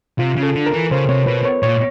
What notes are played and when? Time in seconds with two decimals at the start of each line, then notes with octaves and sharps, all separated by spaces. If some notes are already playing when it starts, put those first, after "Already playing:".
0.19 C3 F4
0.37 C#3
0.43 A4
0.55 D3
0.66 A#4
0.72 E3
0.91 C#3 C5
1.09 C3 C#5
1.27 B2 B4
1.45 C#5
1.63 A#2 C#5